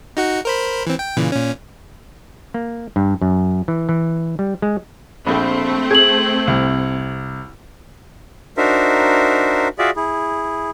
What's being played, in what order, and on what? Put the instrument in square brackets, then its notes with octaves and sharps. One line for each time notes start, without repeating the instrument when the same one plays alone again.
[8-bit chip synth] D#4 F#4 F#5
A#4 C5 B5
E3 C4
G5
A#2 C#3 E3
A#2 C#4
[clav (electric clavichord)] A#3
G2
F#2
E3
E3
G3
G#3
[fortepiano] A#1 [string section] A3 C4 [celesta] B5
[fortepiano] G#4 [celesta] G#6 F#7
[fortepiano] C2
[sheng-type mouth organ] D4 D#4 F#4 A#4 C5 E5
F4 F#4 G#4 D5 E5
E4 G#4